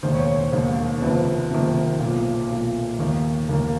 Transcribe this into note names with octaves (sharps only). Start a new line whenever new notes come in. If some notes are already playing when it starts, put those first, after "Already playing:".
E1 D#2 D#3 C5
C#5
C#5
C5
E1 D#2 D#3
F#1 F2 C3 D#3 B4
F#1 F2 C3 D#3
B1 A#2
B1 A#2
D#2 D#3
D#2 D#3 A#4